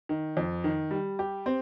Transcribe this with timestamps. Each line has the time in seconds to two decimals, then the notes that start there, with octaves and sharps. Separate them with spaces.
0.09 D#3
0.37 F2
0.64 D#3
0.91 G3
1.19 G4
1.46 C4